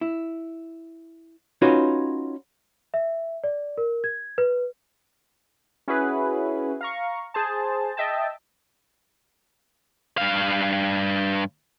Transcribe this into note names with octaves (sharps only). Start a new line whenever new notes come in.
E4
C#4 D#4 F4 F#4 B4
E5
D5
A#4
G#6
B4
C#4 E4 F#4 G#4 B4
F5 A#5 C#6
G#4 C5 A5
D#5 E5 G5 A5
G2 F5